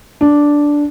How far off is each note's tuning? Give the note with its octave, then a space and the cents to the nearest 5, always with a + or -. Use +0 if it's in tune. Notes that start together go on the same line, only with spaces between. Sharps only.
D4 -5